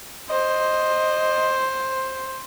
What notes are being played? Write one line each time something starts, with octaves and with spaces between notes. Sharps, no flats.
C5 D#5